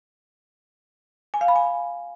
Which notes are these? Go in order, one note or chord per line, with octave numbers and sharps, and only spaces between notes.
G#5
F5
B5
G#5